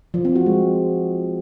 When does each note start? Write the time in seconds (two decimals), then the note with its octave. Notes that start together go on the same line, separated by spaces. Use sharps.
0.14 F3
0.25 C4
0.36 F#4
0.46 G#3